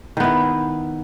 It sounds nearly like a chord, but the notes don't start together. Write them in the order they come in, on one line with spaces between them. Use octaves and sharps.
D#3 B3 E4